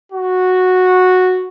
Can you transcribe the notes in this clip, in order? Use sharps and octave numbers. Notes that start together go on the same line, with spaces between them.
F#4